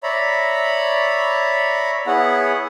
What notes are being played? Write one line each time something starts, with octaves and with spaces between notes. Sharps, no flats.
C#5 D5 E5 A#5 B5
B3 E4 G#4 C#5 F#5